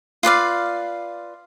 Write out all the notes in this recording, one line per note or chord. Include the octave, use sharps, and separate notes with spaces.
F4 B4 D5 F5